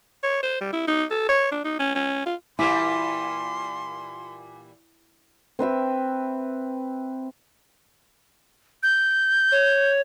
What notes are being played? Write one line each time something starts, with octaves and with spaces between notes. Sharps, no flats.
C#5
C5
G3
E4
D#4
A4
C#5
D4
D#4
C#4
C#4
F4
A#2 E3 G3 E4 G#5 C6 D6 B6
C4 B4 E5 G5
G6
C#5